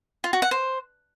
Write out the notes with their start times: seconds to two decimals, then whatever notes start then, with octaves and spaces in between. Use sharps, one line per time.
0.24 F4
0.33 F#4
0.42 F#5
0.51 C5